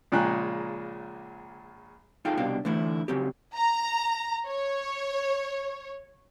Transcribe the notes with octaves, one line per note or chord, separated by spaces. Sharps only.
A#1 A#2 C#3 G#3 G5 F#6
D#4 F4 G#4 A4 F5 G5
C2 B2 D4 G4 F5
D3 E3 A3 E4
C#3 F#3 C4 G4
A#5
C#5